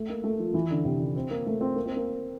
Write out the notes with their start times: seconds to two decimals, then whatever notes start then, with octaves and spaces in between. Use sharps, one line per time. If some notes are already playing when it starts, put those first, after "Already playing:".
Already playing: A3
0.09 A#3
0.24 A3
0.39 F3
0.54 E3
0.70 D3
0.85 C3
1.00 D3
1.16 C4
1.30 A#3
1.46 A3
1.61 C4
1.76 A#3
1.86 C4
1.96 A#3